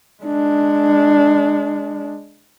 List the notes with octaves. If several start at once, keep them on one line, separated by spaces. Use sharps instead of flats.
G#3 D4